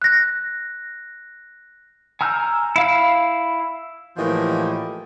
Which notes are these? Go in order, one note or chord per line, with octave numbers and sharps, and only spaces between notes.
F#6 A#6
G#5 A#5 E6 F6 G6
E4 F5 B5
A2 E3 F3 A#3 G4 D#5